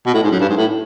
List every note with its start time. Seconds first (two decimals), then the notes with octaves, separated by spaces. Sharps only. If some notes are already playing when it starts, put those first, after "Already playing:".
0.06 B2
0.14 A2
0.23 G#2
0.31 F#2
0.40 G2
0.49 G#2
0.57 A2